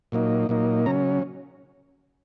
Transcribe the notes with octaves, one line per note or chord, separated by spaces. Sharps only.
A#2 F#3 A#3 D#4
A#2 F#3 A#3 D#4
C#3 F#3 C#4 A#5